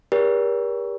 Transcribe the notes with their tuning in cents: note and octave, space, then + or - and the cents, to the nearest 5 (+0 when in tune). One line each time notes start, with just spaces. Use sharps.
G4 +35 A#4 +35 D5 -45